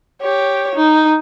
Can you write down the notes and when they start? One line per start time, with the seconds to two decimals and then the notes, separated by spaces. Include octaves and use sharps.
0.21 G4 C#5
0.75 D#4